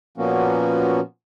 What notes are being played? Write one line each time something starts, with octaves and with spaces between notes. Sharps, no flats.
A#2 F3 A#3 B3 C#4 F#4